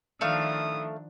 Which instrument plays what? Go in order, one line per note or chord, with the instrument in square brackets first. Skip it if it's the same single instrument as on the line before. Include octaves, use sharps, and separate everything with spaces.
[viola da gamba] D#3 F3 D4 [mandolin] A3 F5 [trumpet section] E4 D#6